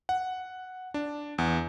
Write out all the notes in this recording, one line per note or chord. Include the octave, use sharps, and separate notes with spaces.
F#5
D4
E2